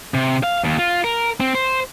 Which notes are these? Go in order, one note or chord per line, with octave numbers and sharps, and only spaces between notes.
C3
F5
D#2
F4
A#4
C4
C5